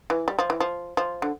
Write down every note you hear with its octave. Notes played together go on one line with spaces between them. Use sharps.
E3
G3
F3
E3
F3
F3
D3